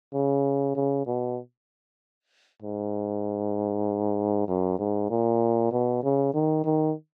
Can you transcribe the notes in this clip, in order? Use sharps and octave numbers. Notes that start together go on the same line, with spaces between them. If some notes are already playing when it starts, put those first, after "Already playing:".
C#3
C#3
B2
G#2
F#2
G#2
A#2
B2
C#3
D#3
D#3